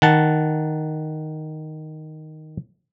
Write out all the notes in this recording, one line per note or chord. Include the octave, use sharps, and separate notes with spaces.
D#3 F#5 A5